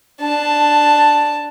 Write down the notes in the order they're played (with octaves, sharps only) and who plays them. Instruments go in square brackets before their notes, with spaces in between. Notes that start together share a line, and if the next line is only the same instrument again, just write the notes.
[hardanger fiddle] D4 A5